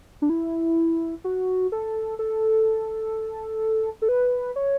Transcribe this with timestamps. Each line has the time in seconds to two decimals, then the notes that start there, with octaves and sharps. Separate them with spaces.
0.22 D4
0.30 E4
1.24 F#4
1.72 A4
2.19 A4
4.02 A4
4.09 B4
4.56 C#5